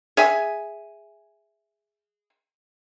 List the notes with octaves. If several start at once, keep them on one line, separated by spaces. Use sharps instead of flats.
G#4 E5 G#5